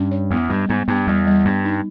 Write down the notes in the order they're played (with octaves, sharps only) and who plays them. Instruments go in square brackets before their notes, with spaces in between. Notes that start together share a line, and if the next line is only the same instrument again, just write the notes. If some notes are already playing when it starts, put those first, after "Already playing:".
Already playing: [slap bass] G2 [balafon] C#4
[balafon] C#5
[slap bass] E2 [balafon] B3
[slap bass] G2 [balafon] G3
[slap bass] G#2 [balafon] B3
[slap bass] G2 [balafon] B3
[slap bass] E2 [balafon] G3
[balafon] G3
[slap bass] G2 [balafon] B3
[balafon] D#4